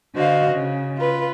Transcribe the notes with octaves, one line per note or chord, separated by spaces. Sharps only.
D3 F#4 C5 D#5 F5
C#3
F4 B4